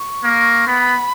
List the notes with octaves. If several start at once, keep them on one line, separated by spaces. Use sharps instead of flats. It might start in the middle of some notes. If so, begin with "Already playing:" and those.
Already playing: C#6
A#3
B3 B5